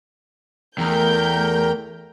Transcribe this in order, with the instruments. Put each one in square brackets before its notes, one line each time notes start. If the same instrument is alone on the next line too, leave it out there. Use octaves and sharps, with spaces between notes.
[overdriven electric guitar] E2 [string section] A3 G6 [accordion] A#4 G5